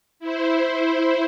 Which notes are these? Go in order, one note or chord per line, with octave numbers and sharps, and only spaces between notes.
E4 C5